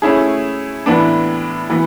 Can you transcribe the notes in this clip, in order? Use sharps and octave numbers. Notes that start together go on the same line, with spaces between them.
A3 C#4 E4 G#4
A2 E3 B3 D4
E3 B3